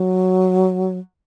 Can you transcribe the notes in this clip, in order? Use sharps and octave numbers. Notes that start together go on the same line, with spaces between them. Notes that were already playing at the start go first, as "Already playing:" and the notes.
Already playing: F#3